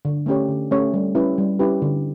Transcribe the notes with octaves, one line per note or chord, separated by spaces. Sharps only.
D3
A3 C#4 G4 C#5
D3
A3 C#4 G4 C#5
G3
C#4 E4 G4 B4
G3
C#4 E4 G4 B4
D3